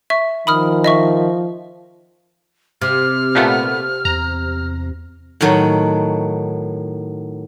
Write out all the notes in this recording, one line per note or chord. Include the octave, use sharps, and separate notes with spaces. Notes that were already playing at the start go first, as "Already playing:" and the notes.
E5 C#6
D#3 F3 B5 D#6 F6
D#5 E5 C#6
C3 F6
A#2 A3 B3
E2 A#5
A2 D#3 F#3